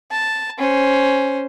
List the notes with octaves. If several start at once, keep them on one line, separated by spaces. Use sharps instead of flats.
A5
C#4 C5